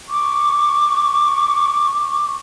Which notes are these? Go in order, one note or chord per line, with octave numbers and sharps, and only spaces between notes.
C#6 D6